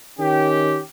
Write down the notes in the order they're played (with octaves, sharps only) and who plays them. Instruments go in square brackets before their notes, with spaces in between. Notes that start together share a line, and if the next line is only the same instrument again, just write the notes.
[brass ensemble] D#3 C#4 G4